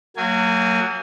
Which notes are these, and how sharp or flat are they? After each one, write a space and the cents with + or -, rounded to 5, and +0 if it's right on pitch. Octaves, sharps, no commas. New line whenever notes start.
F#3 +0 A#3 -35 G#5 +0